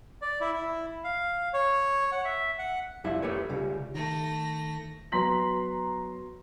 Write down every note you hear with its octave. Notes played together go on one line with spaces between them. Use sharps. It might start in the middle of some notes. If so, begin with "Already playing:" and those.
D5
E4
E4
F5
C#5
F#5
E5
F#5
F2 G3 E4 E5
A3 G4 B4 C#5
C#2 C#3 G3
D#3 A3 A#6
F#3 B3 A#5 C6 B6 F#7